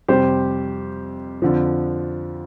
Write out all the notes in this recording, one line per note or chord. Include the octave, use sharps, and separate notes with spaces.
F2 C3 G3 G4 C5
F2 D3 F3